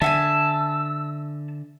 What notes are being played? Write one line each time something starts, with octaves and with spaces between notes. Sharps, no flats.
D3 E5 F#5 G#5 A5 E6